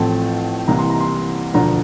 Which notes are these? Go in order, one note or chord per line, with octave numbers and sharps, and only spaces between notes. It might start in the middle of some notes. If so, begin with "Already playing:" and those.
Already playing: A1 A2 F3 A3 C4 A5
C2 C3 E3 A#3 A#5
C6
A#5
C6
E1 D2 D3 F3 A#5